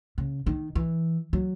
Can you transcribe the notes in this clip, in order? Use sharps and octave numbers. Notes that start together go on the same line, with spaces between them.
C#3
D#3
E3
F#3